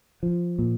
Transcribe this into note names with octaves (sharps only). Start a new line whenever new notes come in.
F3
A#2